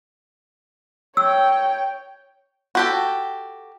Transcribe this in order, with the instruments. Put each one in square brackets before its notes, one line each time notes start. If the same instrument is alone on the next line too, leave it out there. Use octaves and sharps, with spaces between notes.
[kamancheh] C#5 G5 [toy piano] E6
[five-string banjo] F#4 G4 A4